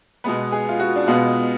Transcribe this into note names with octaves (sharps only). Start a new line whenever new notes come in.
B2 G#3 B3 B4
G#4
F4
F#4
D4
B2 G#3 B3 F4